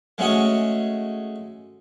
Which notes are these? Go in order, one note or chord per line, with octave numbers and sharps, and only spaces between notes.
G#3 A3 C#4 F#4 G#4